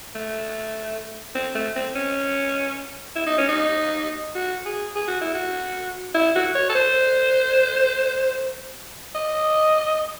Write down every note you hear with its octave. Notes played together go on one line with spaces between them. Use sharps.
A3
C4
A3
C4
C#4
E4
D#4
C#4
D#4
F#4
G#4
G#4
F#4
E4
F#4
E4
F#4
C#5
A4
C5
D#5